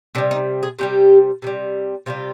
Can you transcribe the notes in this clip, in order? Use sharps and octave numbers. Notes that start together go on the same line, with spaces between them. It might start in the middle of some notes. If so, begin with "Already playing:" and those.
C3 D#3 G3 D4
D#4
G#4
C3 D#3 G3 G4
C3 D#3 G3
C3 D#3 G3 F4